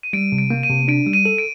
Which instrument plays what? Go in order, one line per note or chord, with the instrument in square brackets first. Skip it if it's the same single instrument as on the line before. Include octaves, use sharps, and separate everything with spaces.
[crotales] D#7
[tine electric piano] G3 [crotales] D7
[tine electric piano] C3
[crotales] D7
[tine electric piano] A#3
[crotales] D#7
[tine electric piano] C3
[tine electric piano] D4 [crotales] D7
[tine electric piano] G3
[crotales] D#7
[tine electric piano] A4
[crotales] D7